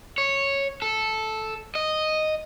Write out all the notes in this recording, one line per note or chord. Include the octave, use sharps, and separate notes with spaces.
C#5
A4
D#5